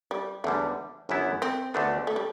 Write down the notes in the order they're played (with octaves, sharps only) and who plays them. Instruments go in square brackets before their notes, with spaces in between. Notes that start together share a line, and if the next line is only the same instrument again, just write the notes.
[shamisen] G3
[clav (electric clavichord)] E2 D3 G3 [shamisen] A3
[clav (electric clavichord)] G1 F#2 E3 B3 E4
[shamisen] C4
[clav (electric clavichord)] D2 D3 A3 D4 [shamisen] B3
[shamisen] A3
G3